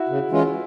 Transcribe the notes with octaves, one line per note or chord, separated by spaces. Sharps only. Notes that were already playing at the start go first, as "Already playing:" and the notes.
Already playing: E4 F#4
C#3
E3 G#3 C#4 F4